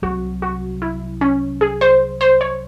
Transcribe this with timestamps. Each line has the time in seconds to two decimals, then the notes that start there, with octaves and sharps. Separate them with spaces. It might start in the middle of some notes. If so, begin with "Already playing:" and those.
0.02 C2 C3 F#3 F#4
0.42 F#4
0.82 E4
1.21 C#4
1.61 G#4
1.81 C5
2.21 C5
2.41 C#5